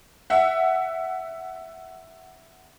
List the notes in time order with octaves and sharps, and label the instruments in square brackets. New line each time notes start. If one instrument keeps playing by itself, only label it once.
[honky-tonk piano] E5 F#5